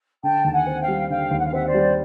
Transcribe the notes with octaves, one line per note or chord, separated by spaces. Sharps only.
D3 G5 A5
D#2 A5
F#5 G#5
C4
F5 G5
G3
D3 F5 G5
D#2
F#5
F5
C4 E5 F#5
C5 D5
G3